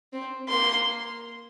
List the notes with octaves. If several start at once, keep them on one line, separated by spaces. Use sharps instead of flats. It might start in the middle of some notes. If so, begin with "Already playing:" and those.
C4
A#3 C6